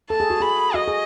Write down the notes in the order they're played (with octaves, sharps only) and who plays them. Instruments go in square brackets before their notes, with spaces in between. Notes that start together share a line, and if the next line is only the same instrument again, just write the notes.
[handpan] A4 [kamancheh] A5
[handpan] G#4
F#4
[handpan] G#4 [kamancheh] B5
[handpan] F#4 [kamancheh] D#5
[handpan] G#4